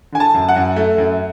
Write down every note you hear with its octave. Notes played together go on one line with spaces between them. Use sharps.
D3 G#5
A5
F#2
F#5
F#2
A3
F#2